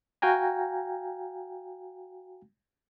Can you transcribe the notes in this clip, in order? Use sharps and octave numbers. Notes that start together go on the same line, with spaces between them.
F#4 F5 G5 G#5 A#5